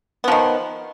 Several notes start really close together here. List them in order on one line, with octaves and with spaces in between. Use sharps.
B3 F3 D#3